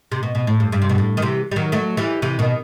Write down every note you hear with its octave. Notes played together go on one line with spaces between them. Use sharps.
C3
B2
B2
A2
G2
G2
C3
B2
A2
D#3
C3 E3
G3
D#3 F#3
F#3 A3
E3 G3
C3 E3
B2 D#3